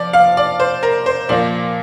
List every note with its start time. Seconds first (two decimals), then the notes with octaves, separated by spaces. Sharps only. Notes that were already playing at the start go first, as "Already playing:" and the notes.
Already playing: F3 D5
0.13 F5
0.37 D5
0.60 C5
0.83 A#4
1.06 C5
1.29 A#2 F3 A#3 D5